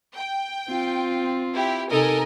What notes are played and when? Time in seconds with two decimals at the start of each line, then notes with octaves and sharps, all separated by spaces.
0.14 G5
0.68 C4 F4
1.55 E4 G4
1.91 C3 D#4 A4 A#4 D#5 G#5